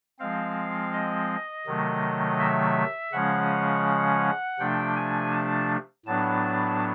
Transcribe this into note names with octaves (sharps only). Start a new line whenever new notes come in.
F3 G#3 C4 F5
D#5
C3 D#3 F#3 A3
E5
C#3 F3 G#3 C#4 F#5
C3 F3 A3 D4 G5
G#5
A5
A2 F#3 B3 D4 A5